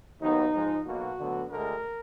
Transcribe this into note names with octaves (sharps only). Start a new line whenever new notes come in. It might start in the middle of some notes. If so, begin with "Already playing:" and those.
D#2 D#3 F#3 B3 D#4
G#2 F3 G#3
B1 B2 A#3 F#4
D2 D3 F#3 B3
D2 D3 G#3 A#4